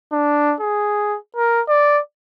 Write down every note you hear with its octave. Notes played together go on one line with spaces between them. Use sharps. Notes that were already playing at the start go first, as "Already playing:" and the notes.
D4
G#4
A#4
D5